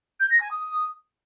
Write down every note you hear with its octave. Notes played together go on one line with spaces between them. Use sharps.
G6
A#6
G#5
D#6